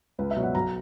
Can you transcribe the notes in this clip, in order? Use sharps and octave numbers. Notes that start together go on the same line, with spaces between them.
C#2 B4
E5
B2 F#3
F#5
B1 A#5